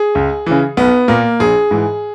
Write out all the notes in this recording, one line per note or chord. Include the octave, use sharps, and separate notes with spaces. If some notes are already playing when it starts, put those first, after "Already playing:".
Already playing: G#4
C#2
C#3 E3
B1 B3
A#2 A#3
A#1 G#4
G#2 E3